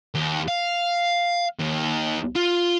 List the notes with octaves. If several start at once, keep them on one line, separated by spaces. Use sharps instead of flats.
D#2
F5
D#2
F4